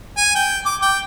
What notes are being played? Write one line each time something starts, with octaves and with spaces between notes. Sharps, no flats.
G#5
G5
D6
G5